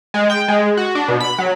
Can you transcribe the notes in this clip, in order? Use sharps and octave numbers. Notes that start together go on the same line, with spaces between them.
G#3
G5
G#3
F#4
D4
B2
B5
F#3